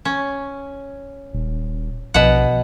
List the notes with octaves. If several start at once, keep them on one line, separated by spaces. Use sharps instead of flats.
C#4
D#1
A#1 B2 F#5